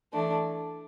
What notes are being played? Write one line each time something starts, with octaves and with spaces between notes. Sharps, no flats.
E3 A3 D4